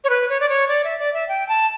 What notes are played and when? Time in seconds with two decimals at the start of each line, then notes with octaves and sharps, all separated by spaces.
0.04 C#5
0.10 B4
0.29 C#5
0.40 D5
0.49 C#5
0.69 D5
0.84 E5
0.99 D5
1.13 E5
1.29 G5
1.49 A5